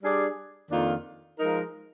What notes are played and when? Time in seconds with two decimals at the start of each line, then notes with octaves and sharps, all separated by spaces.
0.02 G3 D4 G#4 D5
0.70 F2 D#3 A#3 D4 F4
1.38 F3 G#3 D#4 A#4